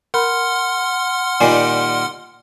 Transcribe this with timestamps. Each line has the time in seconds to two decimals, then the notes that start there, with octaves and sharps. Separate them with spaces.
0.14 A#4 F#5 B5 C6 F6
1.41 A#2 D#3 G3 F4 G#5